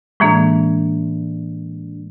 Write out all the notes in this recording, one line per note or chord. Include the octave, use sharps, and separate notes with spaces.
A2 E3 G#3 A#3 D4